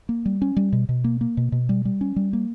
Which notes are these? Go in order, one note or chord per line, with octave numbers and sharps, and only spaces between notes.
A#3
G3
C#4
G3
B2
B2
A#3
A#3
B2
B2
G3
G3
C#4
G3
A#3